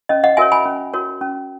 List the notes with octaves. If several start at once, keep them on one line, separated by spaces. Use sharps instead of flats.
C#4 D#5
D#5 F#5
F#4 A#4 C#5 E5 G#5
G#5 B5
C#4
F#4 A#4 C#5
C#4